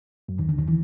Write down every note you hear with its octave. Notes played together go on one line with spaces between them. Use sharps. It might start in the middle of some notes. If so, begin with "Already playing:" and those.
F#2 F#3
D#2 D#3
D2 D3
D#2 D#3
E3